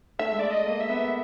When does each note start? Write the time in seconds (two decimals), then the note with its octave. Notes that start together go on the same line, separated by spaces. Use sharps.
0.19 A3 E5
0.32 G#3
0.39 A3 D5
0.50 D#5
0.66 A#3
0.80 E5
0.89 B3